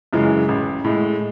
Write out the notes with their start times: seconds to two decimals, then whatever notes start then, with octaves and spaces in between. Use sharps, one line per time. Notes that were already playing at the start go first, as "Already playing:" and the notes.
0.13 F#2 C#3 E3 G#3
0.49 A1
0.84 A2 G#3